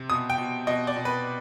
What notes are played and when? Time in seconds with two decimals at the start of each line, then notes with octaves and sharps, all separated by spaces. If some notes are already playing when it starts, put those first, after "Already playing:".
Already playing: C3
0.10 B2 D#6
0.30 G5
0.38 B2
0.67 B2 D#5
0.87 D5
0.96 B2
1.05 B4